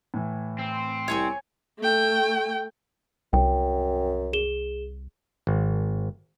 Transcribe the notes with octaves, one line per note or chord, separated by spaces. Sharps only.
A2 E3
C4
C2 C#5 G#5 C#6
A3 G5
C2 F#2 G5
G#4 E7 G7
G#1